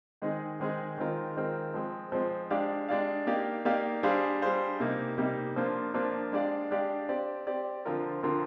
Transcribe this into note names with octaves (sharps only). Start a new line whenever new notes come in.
D#3 G#3 C4 D#4 G#4
D#3 G#3 C4 D#4 G#4
D#3 G#3 C4 F4 A#4
D#3 G#3 C4 F4 A#4
F3 G#3 C4
F3 G#3 C4
G#3 D4 G4 D5 F5
G#3 D4 G4 D5 F5
A#3 D#4 G4 D5 F5
A#3 D#4 G4 D5 F5
G3 D4 G#4 C5 F5
G3 D4 G#4 C5 F5
C3 G3 A#3 D#4
C3 G3 A#3 D#4
F3 A#3 D4 F4 C5
F3 A#3 D4 F4 C5
G#3 D4 G4 D5 F5
G#3 D4 G4 D5 F5
C4 G4 D5
C4 G4 D5
D3 F3 C4 F4 A#4
D3 F3 C4 F4 A#4